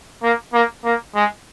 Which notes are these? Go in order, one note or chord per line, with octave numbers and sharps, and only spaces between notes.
A#3
A#3
A#3
G#3